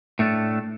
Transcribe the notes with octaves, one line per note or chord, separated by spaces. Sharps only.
A2 A3 D4